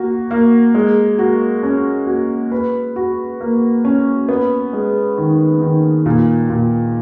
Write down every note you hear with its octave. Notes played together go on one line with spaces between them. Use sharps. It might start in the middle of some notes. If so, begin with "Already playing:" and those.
Already playing: A#3 F#4
A#3
G#3
F#4
C#4
F#4
B4
F#4
A#3
C#4
B3
G#3
D#3
D#3
A#2
A#2